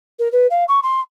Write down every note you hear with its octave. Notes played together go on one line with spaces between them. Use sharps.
A#4
B4
F5
C#6
C6